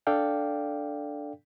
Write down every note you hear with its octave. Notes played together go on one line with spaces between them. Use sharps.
D4 A4 D5 F5 G5